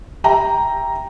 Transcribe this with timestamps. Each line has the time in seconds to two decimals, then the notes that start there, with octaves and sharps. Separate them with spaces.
0.24 G4 E5 G5 A#5